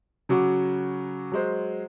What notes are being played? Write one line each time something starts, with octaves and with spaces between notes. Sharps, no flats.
C#3 F#3 F#4 D6
F#3 G#3 C5